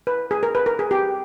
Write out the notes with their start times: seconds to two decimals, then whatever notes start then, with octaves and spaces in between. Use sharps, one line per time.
0.07 B4
0.31 G#4
0.43 A#4
0.55 B4
0.66 A#4
0.79 G#4
0.91 G4